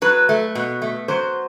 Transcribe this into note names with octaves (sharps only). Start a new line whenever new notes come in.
F#3 B4
A3
B2
A3
F#3 C5